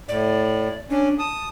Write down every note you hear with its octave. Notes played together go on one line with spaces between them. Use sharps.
A2 D5
C#4 D4
A5 D#6